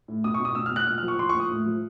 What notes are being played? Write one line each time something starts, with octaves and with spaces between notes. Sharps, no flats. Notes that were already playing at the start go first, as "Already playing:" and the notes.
A2
B2 D#6
C#6
B2
D#6
B2 E6
F6
B2 F#6
A#2 F6
F3 F6
C#6
F3 C6
C#6
A#2
D#6
A2
F3